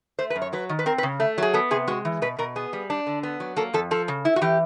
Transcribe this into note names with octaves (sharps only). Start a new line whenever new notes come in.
A3 C5
B4
F#2
C#5
F#3 B4
D#3
B4
C4 A#4
B4
C#3
A3
F#3 G#4
B3 A4
C3 G#4
G#3 F#4
E3
B2 B4
B2 A#4
B3 G#4
G3
D4
D3
B3
F#3
A#3 A4
F2 A4
F3 A4
C#3
E4
F#4
E3 G4